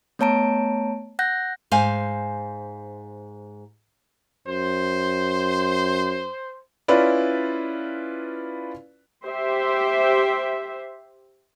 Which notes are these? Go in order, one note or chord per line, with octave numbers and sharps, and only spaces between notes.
A3 B3 C#5 A5 A#5 D7
F#5 F#6 G6 A#6
G#2 C5 F5 G#5
F#2 C5
C#4 E4 F4 B4 D5
G4 C5 E5